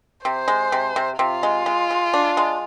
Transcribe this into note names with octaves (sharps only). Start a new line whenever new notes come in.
C3 C5
G#3
C3
C3
C3 F4
G#3
G#3
G#3
D4
G#3